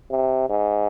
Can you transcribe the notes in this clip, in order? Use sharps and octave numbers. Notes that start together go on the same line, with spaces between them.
C3
G#2